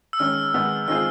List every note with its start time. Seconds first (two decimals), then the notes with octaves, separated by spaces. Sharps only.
0.13 E6
0.19 D#3 G#3 C#4 F6
0.54 D#3 G#3 B3
0.88 D#3 G#3 C4 F4 G#4 F6